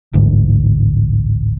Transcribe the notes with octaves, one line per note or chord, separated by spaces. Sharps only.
D1 A1 G#2 D3